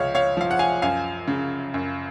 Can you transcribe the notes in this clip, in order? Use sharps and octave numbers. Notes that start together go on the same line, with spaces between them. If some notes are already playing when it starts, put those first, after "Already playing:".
Already playing: C#2 F3 C#5 F5
C#5 F5
F3 F5
F#5
F5 G#5
F#2 F5 G#5
C#3
F#2